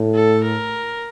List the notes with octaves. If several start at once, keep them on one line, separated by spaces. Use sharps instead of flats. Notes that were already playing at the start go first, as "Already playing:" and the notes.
Already playing: A2
A4
A#4